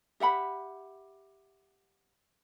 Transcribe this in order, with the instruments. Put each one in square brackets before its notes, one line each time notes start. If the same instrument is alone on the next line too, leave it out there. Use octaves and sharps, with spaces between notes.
[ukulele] G4 E5 F#5 B5